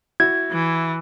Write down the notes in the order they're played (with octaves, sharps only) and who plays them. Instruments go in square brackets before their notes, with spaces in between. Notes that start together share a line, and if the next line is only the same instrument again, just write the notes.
[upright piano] E4 F#4 E5 [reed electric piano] G#6
[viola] E3